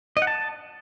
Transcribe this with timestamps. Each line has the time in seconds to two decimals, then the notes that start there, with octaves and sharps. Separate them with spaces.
0.17 D#5
0.22 F#5
0.27 A5